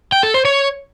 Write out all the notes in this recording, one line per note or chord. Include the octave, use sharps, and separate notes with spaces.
G5
A4
C5
C#5